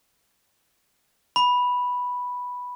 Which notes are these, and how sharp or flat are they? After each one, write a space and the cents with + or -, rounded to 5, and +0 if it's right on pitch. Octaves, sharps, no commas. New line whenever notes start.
B5 -5